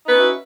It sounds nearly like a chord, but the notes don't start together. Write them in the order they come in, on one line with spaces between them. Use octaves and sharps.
D#4 B4 C#4 F#4 E4